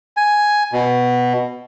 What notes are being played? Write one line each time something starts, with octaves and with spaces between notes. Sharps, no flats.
G#5
B2